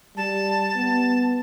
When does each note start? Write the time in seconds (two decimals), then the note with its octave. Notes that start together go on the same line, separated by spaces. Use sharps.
0.17 G3 A5
0.76 B3